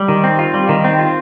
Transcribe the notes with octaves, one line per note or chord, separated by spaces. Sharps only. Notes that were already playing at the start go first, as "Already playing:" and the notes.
Already playing: G3
D#3
C4
F4
G3
D#3
C4
F4